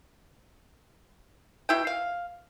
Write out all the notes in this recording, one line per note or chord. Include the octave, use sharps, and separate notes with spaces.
B2 E4 G5
F5